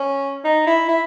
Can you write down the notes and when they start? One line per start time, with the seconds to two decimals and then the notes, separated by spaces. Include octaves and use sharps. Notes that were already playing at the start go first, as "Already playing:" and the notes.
Already playing: C#4
0.44 D#4
0.67 E4
0.88 E4